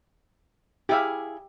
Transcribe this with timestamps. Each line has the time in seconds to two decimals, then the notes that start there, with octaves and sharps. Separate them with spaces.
0.89 E4 G4 G#4 E5 F5